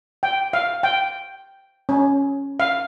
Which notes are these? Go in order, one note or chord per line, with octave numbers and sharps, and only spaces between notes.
G5
F5
G5
C#4
F5